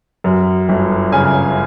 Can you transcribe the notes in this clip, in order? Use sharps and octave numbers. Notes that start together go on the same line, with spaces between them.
F#2
G1
C#3 G#5